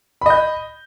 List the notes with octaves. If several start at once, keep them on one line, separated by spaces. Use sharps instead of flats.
D#5 B5 G6